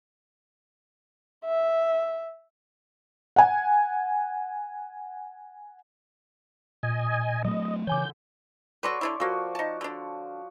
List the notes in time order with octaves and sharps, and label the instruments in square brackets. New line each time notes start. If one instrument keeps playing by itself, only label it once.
[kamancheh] E5
[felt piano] F#5 G#5
[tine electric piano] A#2 [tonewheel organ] D#5 G#5
[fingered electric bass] F#3 A3 [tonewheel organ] D#5
[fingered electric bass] C#3 E3 [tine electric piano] C#5 G#5 D6 [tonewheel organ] G6
[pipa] F#4 A4 B4 [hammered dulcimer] C#5 D5 C6
[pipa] D3 D4 E4
[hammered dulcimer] F3 F#4 [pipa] A#3 A4
[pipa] D#4 A5
D3 D4